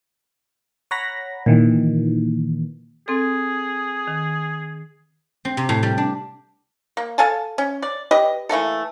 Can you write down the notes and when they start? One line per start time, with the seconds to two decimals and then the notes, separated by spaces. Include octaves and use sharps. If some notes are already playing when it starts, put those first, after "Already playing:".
0.91 C#5 F#5 A#5 B5 A#6
1.46 A#2 D#3 E3
3.08 C4 G#4 A4
4.08 D#3
5.45 C4
5.57 C3
5.69 A2
5.83 G3
5.98 D4
6.97 A#3
7.18 A4 F5 G#5 A5
7.58 C#4
7.82 D5
8.11 G4 B4 D5 D#5
8.49 E3 A3 A#3 A4